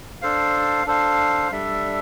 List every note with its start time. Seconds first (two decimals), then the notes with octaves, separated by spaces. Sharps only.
0.22 D4 A4 C5 F5
0.86 D4 A4 C5 F5
1.51 G3 D4 A4 E5